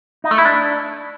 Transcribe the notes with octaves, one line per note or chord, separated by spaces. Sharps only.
D#4
A3
E4
D4